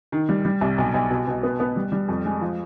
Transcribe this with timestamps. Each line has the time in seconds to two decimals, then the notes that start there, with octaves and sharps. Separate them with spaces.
0.12 D#3
0.29 G3
0.45 G3
0.61 C2
0.78 B1
0.94 B1
1.10 B2
1.27 B2
1.43 B3
1.60 B3
1.76 G3
1.92 G3
2.09 F2
2.25 G#3
2.41 F3